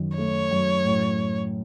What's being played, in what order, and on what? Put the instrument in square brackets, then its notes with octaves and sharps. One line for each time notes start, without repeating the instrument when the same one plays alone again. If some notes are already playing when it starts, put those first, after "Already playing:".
Already playing: [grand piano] F#2 D#3
[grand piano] A3 [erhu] C#5
[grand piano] F#2
A2